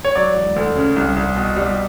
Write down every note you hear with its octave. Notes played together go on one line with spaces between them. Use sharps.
C#5
F#3 D5
E1
D2
C#3
C2
C2
B2
G3